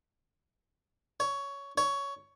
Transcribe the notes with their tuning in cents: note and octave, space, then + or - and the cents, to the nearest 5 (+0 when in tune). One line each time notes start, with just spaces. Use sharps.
C#5 +15
C#5 +15